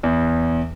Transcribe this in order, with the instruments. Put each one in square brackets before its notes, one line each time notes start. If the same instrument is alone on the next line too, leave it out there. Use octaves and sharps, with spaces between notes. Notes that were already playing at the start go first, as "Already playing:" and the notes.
[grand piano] E2